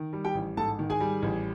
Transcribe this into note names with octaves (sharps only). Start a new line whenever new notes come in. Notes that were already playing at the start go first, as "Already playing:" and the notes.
Already playing: D#3
G3
G4 G5
A1
G#2 A4 A5
D#3
G#4 G#5
G3
A1